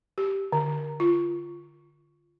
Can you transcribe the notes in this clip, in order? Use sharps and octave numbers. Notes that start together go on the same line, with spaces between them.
G4
D3
F4